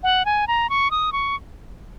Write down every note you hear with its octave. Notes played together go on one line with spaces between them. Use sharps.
F#5
G#5
A#5
C#6
D#6
C#6